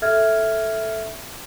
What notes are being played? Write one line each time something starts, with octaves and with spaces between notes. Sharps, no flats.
A4 E5 F6 G#6